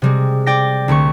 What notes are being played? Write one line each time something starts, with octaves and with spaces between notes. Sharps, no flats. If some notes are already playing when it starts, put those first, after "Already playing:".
C3 G3 G#3
D5 G5 D6 A#6
C2 D3 A3 C#6